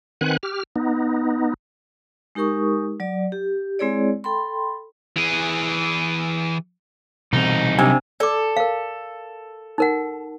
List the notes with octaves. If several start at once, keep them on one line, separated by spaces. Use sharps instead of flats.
D#3 C4 B4 F#5 G#5 F#6
G4 F6
B3 D#4
G#3 D#4 G4 A#4 C#6 D#6
F#3 D5
G4
G#3 C4 E4 G#4 C#5 D5
A4 G5 B5 C6
E3 G#4
C2 B2 E3 C4 D#4
C3 F#3 D4 G#5
A4 D5 D6
A#4 F5
D#4 A#4 F#5